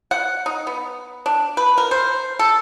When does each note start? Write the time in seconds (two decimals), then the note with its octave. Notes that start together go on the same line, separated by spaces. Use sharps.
0.11 F#5
0.46 D#4
0.67 B3
1.26 D4
1.57 B4
1.78 A#4
1.91 C5
2.39 A4